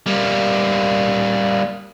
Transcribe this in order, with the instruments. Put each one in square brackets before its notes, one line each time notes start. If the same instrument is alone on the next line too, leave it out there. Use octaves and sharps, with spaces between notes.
[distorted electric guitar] G3 A#3